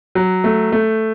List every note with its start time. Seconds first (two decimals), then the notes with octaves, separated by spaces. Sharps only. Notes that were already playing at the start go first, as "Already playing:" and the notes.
0.15 F#3
0.44 A3
0.72 A3